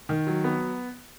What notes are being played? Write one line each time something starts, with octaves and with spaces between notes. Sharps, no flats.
D#3
F#3
B3